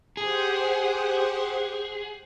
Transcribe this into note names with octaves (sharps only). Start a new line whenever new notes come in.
G4 G#4 C5 F#5